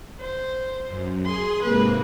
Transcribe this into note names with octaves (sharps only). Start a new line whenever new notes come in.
C5
F#2
G#4 C6
G#2 C3 A#3 B4